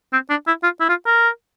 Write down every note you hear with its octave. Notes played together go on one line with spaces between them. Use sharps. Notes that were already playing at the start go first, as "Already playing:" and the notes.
C4
D4
E4
F4
E4
F4
A#4